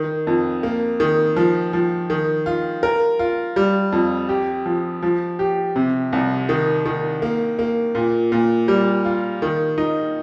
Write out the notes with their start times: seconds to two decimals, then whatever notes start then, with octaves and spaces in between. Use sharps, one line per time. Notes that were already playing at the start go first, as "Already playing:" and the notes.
Already playing: D#3
0.27 F2
0.63 A#3
1.00 D#3
1.36 F3
1.73 F3
2.10 D#3
2.46 F4
2.83 A#4
3.19 F4
3.56 G3
3.92 F2
4.29 G4
4.66 F3
5.03 F3
5.39 G4
5.76 C3
6.13 C2
6.49 D#3
6.85 D#3
7.22 A#3
7.59 A#3
7.95 A#2
8.32 A#2
8.68 G3
9.05 F4
9.42 D#3
9.78 D#4